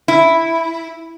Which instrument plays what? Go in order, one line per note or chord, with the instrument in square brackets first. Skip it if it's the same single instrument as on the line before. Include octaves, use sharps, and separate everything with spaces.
[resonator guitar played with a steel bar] E4